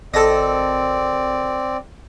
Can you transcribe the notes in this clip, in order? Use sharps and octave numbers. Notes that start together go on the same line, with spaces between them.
G#1 C4 A4 D5 D#5